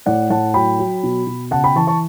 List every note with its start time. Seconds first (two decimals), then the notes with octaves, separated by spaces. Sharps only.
0.06 A2 D5 F#5
0.30 A2 F#5 A5
0.54 F#3 G5 B5
0.79 F#3
1.03 B2
1.27 B2
1.51 C#3 F#5 A5
1.64 G5 B5
1.76 E3 A5 C#6
1.87 A5 C#6